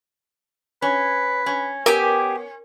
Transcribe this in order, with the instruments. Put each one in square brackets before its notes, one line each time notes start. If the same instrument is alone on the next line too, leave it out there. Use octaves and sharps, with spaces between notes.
[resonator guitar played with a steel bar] C#4 [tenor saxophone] B4
[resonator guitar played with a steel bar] C#4
[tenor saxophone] B3 [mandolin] G4 G#5 D6 [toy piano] A#4